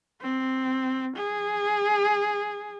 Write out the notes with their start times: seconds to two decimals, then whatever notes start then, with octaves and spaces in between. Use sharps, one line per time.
0.21 C4
1.16 G#4